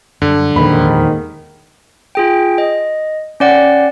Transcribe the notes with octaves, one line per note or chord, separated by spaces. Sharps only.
F#2 D3 G3
D#1 E2 G#2 D#3 F3 D4 B5
F4 G#4 G5
D#5
C#4 D5 F#5 G5